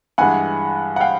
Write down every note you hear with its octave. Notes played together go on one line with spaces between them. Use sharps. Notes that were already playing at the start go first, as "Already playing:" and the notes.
G2 E3 G#3 F#5 G#5
F#5
F5 G5